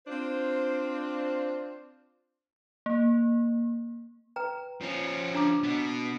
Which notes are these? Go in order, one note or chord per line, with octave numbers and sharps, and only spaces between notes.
C4 D4 F4 C5
A#3
B4 G5 A#5
F3 C#4
D4 A#5 D6
B2 B3